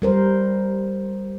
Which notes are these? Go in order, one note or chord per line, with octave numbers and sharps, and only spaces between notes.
G3 A#4 C5